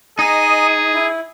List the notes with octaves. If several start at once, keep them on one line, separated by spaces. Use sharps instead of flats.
D#4 G#4 D#5 G#5 D#6
E4